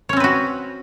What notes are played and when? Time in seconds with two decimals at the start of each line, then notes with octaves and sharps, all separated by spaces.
0.09 C#5
0.13 C#4
0.17 C4
0.20 B4
0.24 F#4